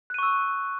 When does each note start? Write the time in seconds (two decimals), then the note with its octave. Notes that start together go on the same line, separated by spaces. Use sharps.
0.10 F#6
0.14 D#7
0.19 C#6
0.23 E6